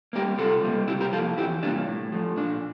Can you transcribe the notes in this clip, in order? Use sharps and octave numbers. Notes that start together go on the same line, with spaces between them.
G3 A#3 G4 A#4
C3 F4 A4
G3 A#3
C3 E4 G4
G4 A#4
F3 A#3 F4 A4
E2 E4 G4
C3 G3 A#3 D4 F4
A2
F3 A3
A#2 D4